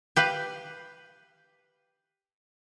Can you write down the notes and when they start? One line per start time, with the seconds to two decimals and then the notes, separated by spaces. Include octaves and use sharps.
0.16 G4 B4 F5